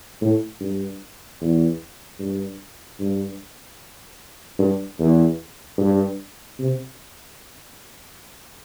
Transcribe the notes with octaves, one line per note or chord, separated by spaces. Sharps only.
A2
G2
E2
G2
G2
G2
E2
G2
C3